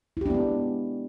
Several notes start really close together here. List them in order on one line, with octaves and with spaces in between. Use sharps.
E4 G4 D4 B3 G#3